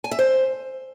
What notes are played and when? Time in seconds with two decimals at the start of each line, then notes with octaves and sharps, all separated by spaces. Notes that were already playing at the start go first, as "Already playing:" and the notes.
0.04 G#5
0.11 E5
0.19 C5